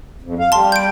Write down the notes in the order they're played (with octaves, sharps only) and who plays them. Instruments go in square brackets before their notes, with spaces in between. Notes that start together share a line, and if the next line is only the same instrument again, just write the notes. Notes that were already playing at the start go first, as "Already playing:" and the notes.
[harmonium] F2
F5
[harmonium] G3 [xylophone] A5 C6
[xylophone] G6 D7